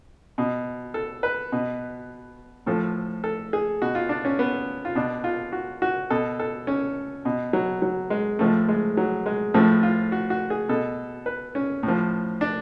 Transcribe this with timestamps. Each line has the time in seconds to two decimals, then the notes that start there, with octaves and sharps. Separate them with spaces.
0.38 B2
0.94 A4
1.23 B4
1.52 B2
2.66 A2 F3 A4
3.24 A4
3.53 G#4
3.82 B2 F#4
3.95 F4
4.09 D4
4.25 C#4
4.39 B3
4.85 F4
4.95 B2 D4
5.24 F4
5.53 F#4
5.82 F#4
6.10 B2 A4
6.40 A4
6.67 C#4
7.25 B2
7.53 F#3
7.82 F#3
8.10 G#3
8.39 A2 F3 A3
8.68 G#3
8.97 F#3
9.26 G#3
9.54 A2 F3 A3
9.83 F4
10.12 F#4
10.30 F#4
10.50 G#4
10.69 B2 A4
11.26 B4
11.55 C#4
11.83 A2
11.88 F3
12.41 D4